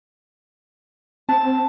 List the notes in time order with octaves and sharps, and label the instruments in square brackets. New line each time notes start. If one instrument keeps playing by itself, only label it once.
[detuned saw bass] C4 [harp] A5